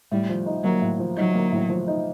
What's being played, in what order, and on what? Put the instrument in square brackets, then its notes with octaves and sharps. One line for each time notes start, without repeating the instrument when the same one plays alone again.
[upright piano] A2 [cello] G3
[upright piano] F3
D#4
[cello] F#3 [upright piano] A#3
[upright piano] A2
F3
[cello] F#3 [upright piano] D#4
[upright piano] A#3
A2
F3
D#4